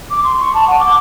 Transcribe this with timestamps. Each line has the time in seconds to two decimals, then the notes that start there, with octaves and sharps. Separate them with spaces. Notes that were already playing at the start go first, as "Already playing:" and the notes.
0.11 D6
0.24 C6
0.41 C#6
0.54 A5
0.67 F#5
0.79 D6